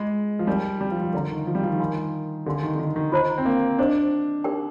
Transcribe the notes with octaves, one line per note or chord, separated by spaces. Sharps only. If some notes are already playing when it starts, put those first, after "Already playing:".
Already playing: G#3 F4 G#4 D#5
F3
G3 D#4 A#4 D5
G3
F3
F3
D3 A#4 D5 F5 A#5
D#3
F3
G3
F3
D#3
F4 A#4 F5 G#5 C6
D3 G4 A#4 F5 G#5 C6
D#3
D3
D#3
D#3
F4 C5 D#5 A#5
C4
A#3
D4 C5 D#5 G5
D#4 G4 A#4 D5 G5